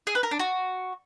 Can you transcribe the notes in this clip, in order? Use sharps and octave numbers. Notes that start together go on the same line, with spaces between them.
G#4
B4
A#4
D4
F#4